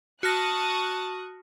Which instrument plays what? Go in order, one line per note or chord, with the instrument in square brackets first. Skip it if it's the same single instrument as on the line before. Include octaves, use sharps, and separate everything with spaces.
[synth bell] F#4 F6 A#6 [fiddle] A5 [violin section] C#6 D#6 F#6